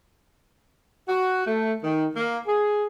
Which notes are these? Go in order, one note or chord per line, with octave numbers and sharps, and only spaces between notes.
F#4
A3
D#3
A#3
G#4